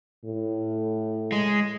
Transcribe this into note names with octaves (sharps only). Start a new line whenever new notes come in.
A2
G#3